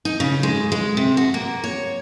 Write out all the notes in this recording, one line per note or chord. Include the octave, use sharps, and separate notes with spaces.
D#4
C#3
G#3
G#3
C3
F#4
A#3
C#5